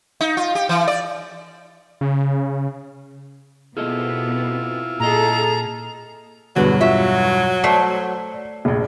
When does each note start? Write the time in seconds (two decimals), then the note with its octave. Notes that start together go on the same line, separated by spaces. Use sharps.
0.21 D#4
0.37 F4
0.55 G4
0.69 E3
0.88 D5
2.01 C#3
3.77 B2 B3 C4 E4 F4 G#4 A4 D#5
5.00 A#2 G#4 A4 D#5 A#5
6.56 E2 G2 B2 D3 F#3 F#4 B4
6.81 F4 F#4 E5 C#6
7.64 A3 C5 D5 C7
8.65 F1 A#1 G#4